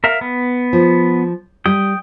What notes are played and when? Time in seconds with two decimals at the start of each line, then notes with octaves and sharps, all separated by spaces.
0.04 A#4 E5 F5
0.21 B3
0.73 F3
1.66 G3 G5 D#6